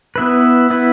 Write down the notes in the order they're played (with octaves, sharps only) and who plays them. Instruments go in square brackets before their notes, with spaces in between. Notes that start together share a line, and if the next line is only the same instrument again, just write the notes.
[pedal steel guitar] B3 E4 B4
B3 E4 B4